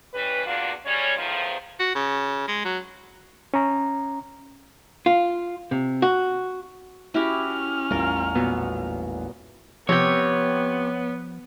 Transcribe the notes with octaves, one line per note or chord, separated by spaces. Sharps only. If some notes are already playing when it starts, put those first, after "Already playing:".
E3 G3 C#4 B4
E2 A#3 D4 F4 F#4
G3 G#3 C#4 C#5
E2 A2 D#3 F3
F#4
C#3
G#3
F#3
C#4 A#5
F4
C3
F#4
C#4 E4 F#4 G4 F6
A1 E2 G3 F4 A#4
A#2 F#3 B3
C3 F3 B3 C#5 G5